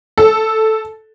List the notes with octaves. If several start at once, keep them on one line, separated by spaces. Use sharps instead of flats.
A4